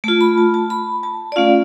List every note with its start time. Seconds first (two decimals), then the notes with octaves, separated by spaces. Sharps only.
0.04 A3 F4 A5
0.21 B5
0.38 A5
0.54 A5
0.70 B5
1.03 A5
1.32 D5
1.36 A3 C#4 F4 F5